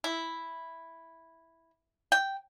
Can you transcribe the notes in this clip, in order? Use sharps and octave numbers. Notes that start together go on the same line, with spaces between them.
E4
G5